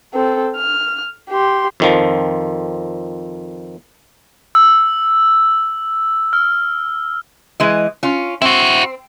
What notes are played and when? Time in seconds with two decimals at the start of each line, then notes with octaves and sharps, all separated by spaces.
0.14 C4 A4
0.57 F6
1.30 G4 C6
1.80 F2 D#3 F3
4.55 E6
6.33 F6
7.60 E3 G#3 D#5
8.03 C#4 F4
8.42 C4 E4 F#4